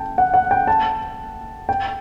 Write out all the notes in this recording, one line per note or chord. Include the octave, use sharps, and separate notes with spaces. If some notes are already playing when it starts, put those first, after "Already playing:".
Already playing: G5 A5
F#5
F#5
G5
A5
G5